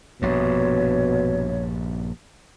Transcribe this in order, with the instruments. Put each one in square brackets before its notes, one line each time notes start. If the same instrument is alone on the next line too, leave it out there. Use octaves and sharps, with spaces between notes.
[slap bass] A#1 G2 [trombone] B2 [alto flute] C#5